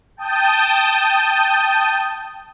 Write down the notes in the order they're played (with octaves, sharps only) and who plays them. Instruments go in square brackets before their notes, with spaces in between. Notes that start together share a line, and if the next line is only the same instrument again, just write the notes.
[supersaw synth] G5 A5 D#6 G6